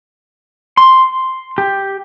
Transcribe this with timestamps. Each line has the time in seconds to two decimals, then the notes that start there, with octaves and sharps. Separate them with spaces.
0.77 C6
1.58 G4